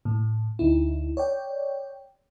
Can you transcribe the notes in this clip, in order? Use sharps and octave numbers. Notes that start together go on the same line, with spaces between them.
A2
D2 D#4 E4
C#5 D5 G5